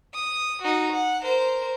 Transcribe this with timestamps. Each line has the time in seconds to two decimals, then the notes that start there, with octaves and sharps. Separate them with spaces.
0.14 D#6
0.62 D#4 F#4
0.92 F#5
1.22 A#4 C5